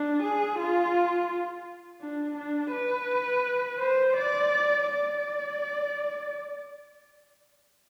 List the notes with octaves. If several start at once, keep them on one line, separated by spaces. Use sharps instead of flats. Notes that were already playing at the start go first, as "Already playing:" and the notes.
Already playing: D4
G#4
F4
D4
D4
B4
C5
D5
D5